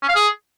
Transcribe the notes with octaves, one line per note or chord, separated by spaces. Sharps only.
C#4
F5
G#4